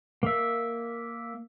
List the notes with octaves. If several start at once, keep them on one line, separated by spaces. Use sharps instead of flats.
A#3 E5